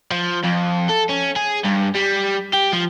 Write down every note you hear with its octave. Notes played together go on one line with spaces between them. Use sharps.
F3
F2
A4
C#4
G#4
G2
G3
G4
F3